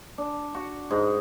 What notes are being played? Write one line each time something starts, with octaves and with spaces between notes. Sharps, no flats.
D4
F#4
G#2